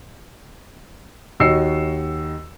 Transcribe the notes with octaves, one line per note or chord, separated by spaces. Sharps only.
D#2 F#4 D#5 E6 C7 C#7